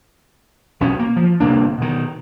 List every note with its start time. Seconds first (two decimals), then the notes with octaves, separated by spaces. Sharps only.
0.80 B1 B2 C#4
0.99 A#3
1.16 F3
1.40 G1 C3 A#3 D4
1.78 B2 D#3